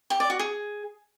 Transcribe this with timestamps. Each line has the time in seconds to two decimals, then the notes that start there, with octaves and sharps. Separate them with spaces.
0.10 G4
0.20 D5
0.30 F#4
0.39 G#4